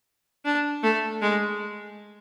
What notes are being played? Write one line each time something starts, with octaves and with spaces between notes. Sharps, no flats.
D4
A3
G#3